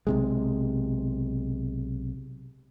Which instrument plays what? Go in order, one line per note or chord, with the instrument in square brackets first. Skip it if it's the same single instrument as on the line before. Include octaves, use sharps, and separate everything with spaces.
[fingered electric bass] B1 C3 G#3